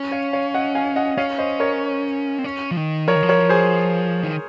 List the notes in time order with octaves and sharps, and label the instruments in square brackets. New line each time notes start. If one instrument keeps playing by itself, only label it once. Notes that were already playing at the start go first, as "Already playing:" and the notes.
Already playing: [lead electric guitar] C#4
[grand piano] C#5 F5
C#5 F5
D#5 F#5
F5 G#5
D#5 F#5
[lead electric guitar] C#4 [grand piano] C#5 F5
[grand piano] C5 D#5
A#4 C#5
[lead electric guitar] C4
C#4
F3
D#3
[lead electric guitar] F3 [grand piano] A#4 C#5
[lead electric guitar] D#3
F3
[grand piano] A#4 C#5
G#4 C5
[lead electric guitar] D#3